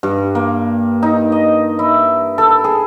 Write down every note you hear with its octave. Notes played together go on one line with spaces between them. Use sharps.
G2
A#3
D#4
D#5
E4
A4
G#4